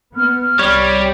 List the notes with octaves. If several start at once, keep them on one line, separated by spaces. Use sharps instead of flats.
B3 F6
C2 G3 C#5